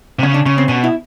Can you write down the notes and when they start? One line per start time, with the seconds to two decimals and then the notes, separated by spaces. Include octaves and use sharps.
0.19 C3
0.23 C#3 C#4
0.34 D4
0.46 C#3 C#4
0.58 C4
0.68 B2 C#4
0.84 E4